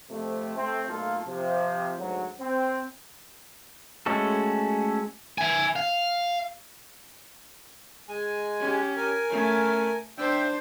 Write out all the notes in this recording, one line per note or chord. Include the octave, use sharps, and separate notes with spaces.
F2 C3 A3
A3 C4
B1 A3 A#3 F4 A4
C3 F3
D2 G#2 F#3
C4
G#3 A3 C#4 F#4 A4
E5 G#5
F5
G#3 G#5
C#4 G4
A#4 G#5
A3 C#4
D4 C5 E5 G5